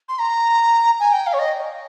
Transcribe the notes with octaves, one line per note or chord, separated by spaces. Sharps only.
C6
A#5
G#5
G5
F5
C#5
D#5